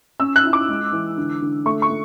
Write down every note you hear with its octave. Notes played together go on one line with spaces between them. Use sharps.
C#4 E6
F#6
E4
D6
G#3
E3
D3
D3
A3 C#6
C#6
A3